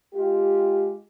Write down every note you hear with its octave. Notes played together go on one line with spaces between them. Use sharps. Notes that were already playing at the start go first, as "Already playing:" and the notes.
G#3 F4 G4